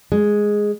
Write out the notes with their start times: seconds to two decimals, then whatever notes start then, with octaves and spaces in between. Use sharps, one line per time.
0.12 G#3